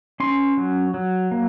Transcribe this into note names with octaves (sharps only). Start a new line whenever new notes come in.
C#4 C6
F#3
F#3
A#3